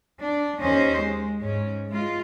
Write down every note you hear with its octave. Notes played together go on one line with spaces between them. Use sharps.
D4
D#2 C#4 C5 D#5
G#3
G#2 C#4
G#3 F4